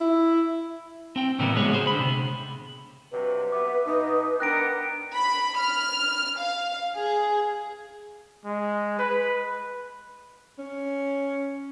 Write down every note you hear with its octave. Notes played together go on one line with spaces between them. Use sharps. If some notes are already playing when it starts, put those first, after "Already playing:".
E4
C4 G5
A2 C#3 E3 G3 A#3 B3
G3 G#3 B3 F#4 G#4 C#5
G#4 C5
D3 B5
C3
G2 C3 F#3 B4
B3 E5 D6
B2 D#4
B3 D4 A#4 G5 F#6 A#6 D7
B5
F6
F5
G#4
G#3
B4
C#4